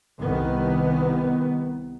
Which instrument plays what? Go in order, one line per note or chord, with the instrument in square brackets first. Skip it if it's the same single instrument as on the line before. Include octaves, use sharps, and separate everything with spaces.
[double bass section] C2 D#3 B3